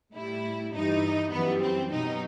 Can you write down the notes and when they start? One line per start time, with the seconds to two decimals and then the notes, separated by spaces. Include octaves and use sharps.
0.14 A2 G3 E4
0.73 G2 E3 G3 D#4
1.32 F#2 E3 G3 B3
1.61 C4
1.91 B2 F#3 D#4